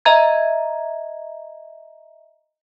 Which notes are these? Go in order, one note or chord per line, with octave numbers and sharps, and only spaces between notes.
D#5 E5 A#5 G#6